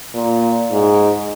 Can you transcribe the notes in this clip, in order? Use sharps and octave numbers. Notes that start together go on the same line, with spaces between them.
A#2
G#2